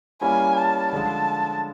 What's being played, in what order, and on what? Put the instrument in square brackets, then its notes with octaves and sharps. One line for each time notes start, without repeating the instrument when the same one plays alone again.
[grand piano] G3 A#3 C#4 E4 [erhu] G#5
[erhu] A5
[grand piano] D3 F3 G#3 [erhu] A5